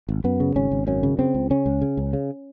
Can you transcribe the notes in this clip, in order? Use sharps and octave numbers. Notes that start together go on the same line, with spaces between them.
G#1
F#2 B3
C#3
G#1 C#4
G#1
F#2 C#4
C#3
C#3 C4
C#2
C#3 C#4
C#2
C#3
C#2
C#3